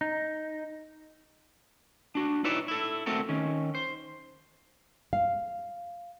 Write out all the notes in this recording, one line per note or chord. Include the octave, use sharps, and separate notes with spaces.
D#4
D4 F#4
D#4 E4 B4 C#5 D5 E5
E4 A4
A3 C4 F#4 A4 A#4
D#3 C#4
C5
F5